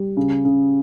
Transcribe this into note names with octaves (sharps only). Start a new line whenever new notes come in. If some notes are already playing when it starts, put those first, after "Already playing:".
Already playing: G3
C#3
C#3